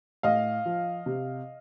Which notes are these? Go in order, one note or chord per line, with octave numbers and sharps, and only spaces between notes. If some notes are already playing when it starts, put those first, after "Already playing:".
A2 D#5 F5
F3
C3